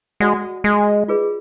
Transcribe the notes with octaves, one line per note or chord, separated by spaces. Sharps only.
G#3 F#4 D5 F#5
G#3
F4 G#4 B4 D5